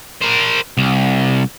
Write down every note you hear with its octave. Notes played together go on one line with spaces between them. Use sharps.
A#4 C5
C2